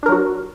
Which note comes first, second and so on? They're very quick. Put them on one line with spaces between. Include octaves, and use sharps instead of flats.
D4 A#4 F#3 F#4